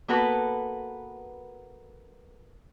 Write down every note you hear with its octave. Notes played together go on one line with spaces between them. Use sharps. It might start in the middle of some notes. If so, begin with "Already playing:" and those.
A#3 B3 F#4 A4 B4